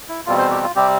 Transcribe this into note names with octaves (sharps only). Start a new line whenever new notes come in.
E4
E2 B2 G3 C4 F4
C5
G4
F4
C3 G3 C4 G4